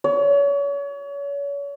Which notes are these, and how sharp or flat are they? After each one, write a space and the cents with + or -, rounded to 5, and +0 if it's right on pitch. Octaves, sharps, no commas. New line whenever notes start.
C#5 +35